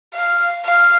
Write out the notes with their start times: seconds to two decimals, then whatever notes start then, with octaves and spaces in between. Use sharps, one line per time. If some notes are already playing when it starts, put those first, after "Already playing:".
0.15 F5
0.65 F5